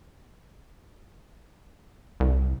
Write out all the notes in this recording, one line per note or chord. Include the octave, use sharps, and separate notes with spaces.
C2